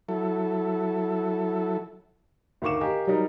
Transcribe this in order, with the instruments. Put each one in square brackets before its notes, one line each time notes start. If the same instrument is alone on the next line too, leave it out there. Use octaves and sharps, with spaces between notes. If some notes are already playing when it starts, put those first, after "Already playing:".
[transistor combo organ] F#3 E4 A4
[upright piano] D2 D#3 F5 C#6 D6 E7
G4 A#4 D#5 F5 G#5
F#3 G3 D#4 A#4